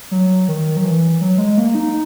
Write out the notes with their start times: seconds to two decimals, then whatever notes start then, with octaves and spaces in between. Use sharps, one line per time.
0.11 F#3
0.48 D#3
0.77 F#3
0.85 E3
1.21 F#3
1.38 G#3
1.57 A#3
1.75 D#4